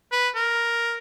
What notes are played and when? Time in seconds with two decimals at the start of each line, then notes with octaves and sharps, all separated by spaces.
0.12 B4
0.35 A#4